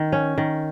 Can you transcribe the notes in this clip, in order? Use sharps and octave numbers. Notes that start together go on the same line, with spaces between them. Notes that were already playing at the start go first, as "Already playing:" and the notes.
Already playing: D#3
C#4
D#3